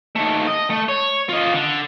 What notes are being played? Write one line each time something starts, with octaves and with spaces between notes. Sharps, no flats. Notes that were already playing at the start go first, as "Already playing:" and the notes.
D#2 A3
D#5
A3
C#5
F4 D#5
D3